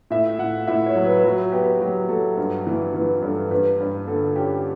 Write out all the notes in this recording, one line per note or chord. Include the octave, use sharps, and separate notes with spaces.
A2 E5
A2 F#5
A2 E5
C#5
F#3
B4
F#3 F#4
B3 G4
F#3 G4
F#3 A4
G2
E3
E3 B4
G2 A4
G2 B4
G2
D3 A4
C#4 G4